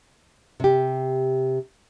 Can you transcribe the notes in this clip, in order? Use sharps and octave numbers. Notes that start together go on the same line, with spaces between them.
C3 G4